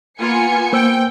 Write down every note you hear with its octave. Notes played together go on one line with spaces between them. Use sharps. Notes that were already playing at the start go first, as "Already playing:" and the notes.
A#3 B3 F4 G#5 C#7
A#3 C5 G5 E6